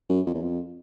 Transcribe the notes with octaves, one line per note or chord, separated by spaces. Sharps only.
F#2
F2
E2
F2